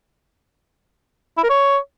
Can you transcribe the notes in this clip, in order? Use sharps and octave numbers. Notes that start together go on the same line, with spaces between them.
E4
A#4
C#5